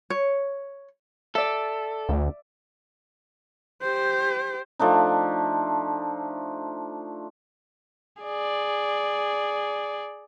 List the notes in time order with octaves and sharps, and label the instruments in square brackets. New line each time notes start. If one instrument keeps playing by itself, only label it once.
[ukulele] C#5
[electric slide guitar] A4 [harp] D5 E5
[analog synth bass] D2
[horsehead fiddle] G4 C5
[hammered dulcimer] F3 A3 D4 D#4
[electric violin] G#4 D5